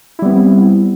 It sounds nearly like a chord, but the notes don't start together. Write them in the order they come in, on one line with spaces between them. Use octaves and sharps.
E4 G3 B3 C4